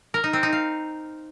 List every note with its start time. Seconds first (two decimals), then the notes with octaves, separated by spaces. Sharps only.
0.14 A#4
0.24 D#4
0.33 C4
0.43 D#4
0.53 F5